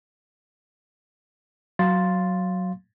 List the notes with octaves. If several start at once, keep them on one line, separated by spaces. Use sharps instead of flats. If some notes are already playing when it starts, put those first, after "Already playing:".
F#3 F5 C6 A6